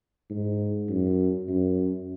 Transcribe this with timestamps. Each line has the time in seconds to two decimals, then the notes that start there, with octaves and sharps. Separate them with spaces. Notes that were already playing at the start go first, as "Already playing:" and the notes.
0.30 G#2
0.89 F#2
1.48 F#2